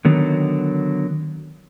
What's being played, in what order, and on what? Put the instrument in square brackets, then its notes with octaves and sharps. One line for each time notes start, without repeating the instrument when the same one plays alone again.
[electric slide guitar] D3 D#3 F#3 B3